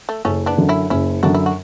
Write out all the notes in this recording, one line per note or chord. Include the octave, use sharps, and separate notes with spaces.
A3
F#1 A3 C#4
B3 D4
F#2 D3
C#4 E4
F#1 C#4 E4
F#2 D3 D4 F#4
E4
F#4